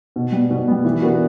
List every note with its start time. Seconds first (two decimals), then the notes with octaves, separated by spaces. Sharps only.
0.16 B2
0.32 G3 B3
0.50 B2
0.68 G3 B3
0.85 E3
1.01 B3 D4 F#4 A#4